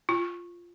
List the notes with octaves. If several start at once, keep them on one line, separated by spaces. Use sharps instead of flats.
F4